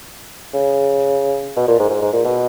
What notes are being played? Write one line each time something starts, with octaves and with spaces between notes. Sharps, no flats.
C#3
B2
A#2
G#2
G#2
G#2
A#2
B2